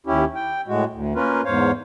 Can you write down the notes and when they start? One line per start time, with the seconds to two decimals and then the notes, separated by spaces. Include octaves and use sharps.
0.07 D#2 C#4 E4 G4
0.35 G5
0.68 A2 G#3 F#4
0.93 D2
1.15 A#3 C#4 F4 A#4 B4
1.45 E2 G#2 C5 C#5 F5